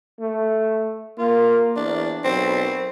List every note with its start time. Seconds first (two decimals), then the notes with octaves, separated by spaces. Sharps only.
0.20 A3
1.19 A#3 F4
1.77 E2 D4
2.25 B1 C4